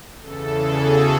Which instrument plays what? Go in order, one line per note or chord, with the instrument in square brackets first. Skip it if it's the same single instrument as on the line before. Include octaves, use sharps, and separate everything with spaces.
[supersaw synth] E2 C#3 E3 A4
G#4
F#4